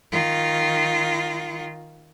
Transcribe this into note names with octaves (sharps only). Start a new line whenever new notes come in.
D#3 F4